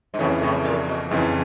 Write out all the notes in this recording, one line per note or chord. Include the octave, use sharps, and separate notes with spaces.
G#2
F2 A2 C#3 E3
A2
A#2
B2
F2 G#2 C#3 E3